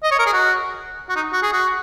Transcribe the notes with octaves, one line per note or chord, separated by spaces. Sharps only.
D#5
C#5
A#4
G#4
F#4
F#4
D#4
F#4
G#4
F#4